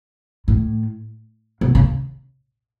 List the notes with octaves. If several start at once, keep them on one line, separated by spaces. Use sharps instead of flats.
A2
B2
C#3